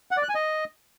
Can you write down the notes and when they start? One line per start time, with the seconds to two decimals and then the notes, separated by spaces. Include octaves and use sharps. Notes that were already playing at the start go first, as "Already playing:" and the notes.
0.11 F#5
0.17 D5
0.23 F#6
0.29 G#5
0.35 D#5